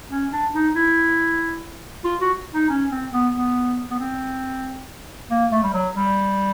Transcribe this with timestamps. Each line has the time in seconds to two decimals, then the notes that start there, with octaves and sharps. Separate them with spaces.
0.10 C#4
0.32 D4
0.53 D#4
0.75 E4
2.04 F4
2.21 F#4
2.54 D#4
2.70 C#4
2.91 C4
3.13 B3
3.35 B3
3.90 B3
4.00 C4
5.31 A#3
5.51 A3
5.63 G3
5.74 F#3
5.95 G3